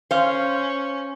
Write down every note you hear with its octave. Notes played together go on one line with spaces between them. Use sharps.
C#4 C5 F5